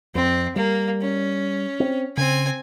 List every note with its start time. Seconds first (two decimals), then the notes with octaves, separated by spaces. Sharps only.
0.15 F2 C4
0.56 G3 A#3
1.02 C#4
1.80 C4
2.17 C#3 C4 G#5